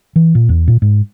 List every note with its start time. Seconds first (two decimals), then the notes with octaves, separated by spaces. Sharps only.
0.16 E3
0.35 A#2
0.49 E2
0.68 A#2
0.82 G#2